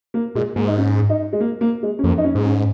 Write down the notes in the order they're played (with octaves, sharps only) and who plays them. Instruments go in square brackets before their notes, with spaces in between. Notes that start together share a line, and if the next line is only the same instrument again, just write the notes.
[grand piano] A#3
[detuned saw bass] A#2 [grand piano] G#3
[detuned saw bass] G#2 [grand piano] A#3
[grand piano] D#4
C#4
D#4
G#3
A#3
A#3
G#3
C#4
[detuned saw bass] F2 [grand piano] A#3
[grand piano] D#4
C#4
[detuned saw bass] G#2
[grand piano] C#4